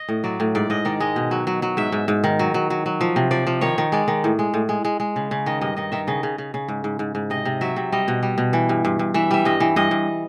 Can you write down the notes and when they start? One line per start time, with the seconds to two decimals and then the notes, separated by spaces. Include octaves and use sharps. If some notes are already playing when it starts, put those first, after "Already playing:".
Already playing: D#5
0.09 A2
0.24 F#3 D5
0.40 A2
0.55 G#2 D5
0.70 G#2 D#5
0.85 D#3 D5
1.00 G#3 D#5
1.16 B2
1.31 F#3
1.47 F#3
1.62 F#3
1.77 G#2 E5
1.92 G#2
2.08 G#2
2.24 D#3
2.39 F#3
2.54 F#3
2.70 F#3
2.86 F#3
3.01 F3
3.16 C3
3.31 F3 D5
3.47 F3
3.61 D#3 C#5
3.78 D#3
3.92 G#3 D5
4.08 D#3
4.24 A2
4.39 G#3
4.54 A2
4.69 G#3
4.85 G#3
5.00 G#3
5.16 C#3
5.31 C#3
5.46 D#3 D#5
5.61 G2 D#5
5.76 D#3 D#5
5.92 D#3 E5
6.07 C#3 D#5
6.23 C#3
6.38 C#3
6.54 C#3
6.68 G#2
6.84 G#2
6.99 G#2
7.15 G#2
7.30 C3 D#5
7.45 C3
7.61 F#3 E5
7.76 C3
7.92 G3 D#5
8.08 B2
8.23 G3
8.38 B2
8.53 E3
8.69 G2
8.85 G2
8.99 G2
9.14 E3 E5
9.31 G3 E5
9.45 G2 D#5
9.60 E3
9.76 G2 D#5
9.91 G2